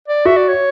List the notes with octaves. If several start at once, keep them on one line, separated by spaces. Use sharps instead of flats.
D5
F#4 E5
D5
C#5